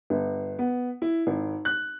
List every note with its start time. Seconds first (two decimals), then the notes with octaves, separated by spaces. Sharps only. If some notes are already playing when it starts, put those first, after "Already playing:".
0.10 G1
0.59 B3
1.02 E4
1.27 G#1
1.65 F#6